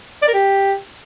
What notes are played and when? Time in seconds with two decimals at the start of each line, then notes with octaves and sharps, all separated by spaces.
0.22 D5
0.28 A#4
0.34 G4